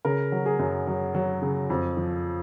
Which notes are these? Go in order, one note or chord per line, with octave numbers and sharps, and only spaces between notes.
C#3 A#4
F#3
G#4
F#2
F#3
F#3
C#3
F2
F3